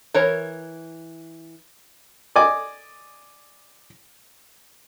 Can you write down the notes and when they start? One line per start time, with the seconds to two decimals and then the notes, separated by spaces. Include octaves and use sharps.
0.14 E3 A#4 C#5
2.36 D5 D#5 G#5 D6